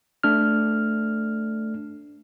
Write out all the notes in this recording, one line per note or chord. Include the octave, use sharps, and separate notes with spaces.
A3 D4 F6